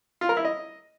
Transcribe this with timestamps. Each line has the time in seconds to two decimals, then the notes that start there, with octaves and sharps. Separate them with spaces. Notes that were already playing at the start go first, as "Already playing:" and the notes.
0.21 F4
0.29 A#4
0.37 E4
0.45 D#5